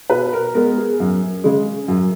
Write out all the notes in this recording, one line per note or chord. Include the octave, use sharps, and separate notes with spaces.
B2 B4
A#4
G#3 B3 A#4
G#4
F#2
C#3 G#3
F#2